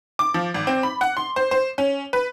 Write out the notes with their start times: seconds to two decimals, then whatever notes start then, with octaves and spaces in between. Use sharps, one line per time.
0.19 D6
0.34 F3
0.54 G#1
0.67 C4
0.83 B5
1.01 F#5
1.17 C6
1.36 C5
1.51 C5
1.78 C#4
2.13 B4